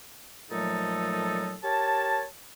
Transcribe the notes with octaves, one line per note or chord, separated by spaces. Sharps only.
A#2 F3 F#3 A3 D#4 A4
G4 A#4 C#5 A5